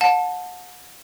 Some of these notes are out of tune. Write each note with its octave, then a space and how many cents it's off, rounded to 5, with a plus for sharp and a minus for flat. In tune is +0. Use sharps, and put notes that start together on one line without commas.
F#5 -40 A5 +0